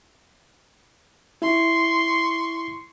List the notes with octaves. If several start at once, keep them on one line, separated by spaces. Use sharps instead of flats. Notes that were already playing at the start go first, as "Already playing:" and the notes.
E4 C6 C#6